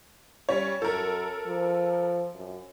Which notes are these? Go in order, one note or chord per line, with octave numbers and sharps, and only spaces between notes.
G3 C#4 C#5
F#2 A4 A#4
F3
F#2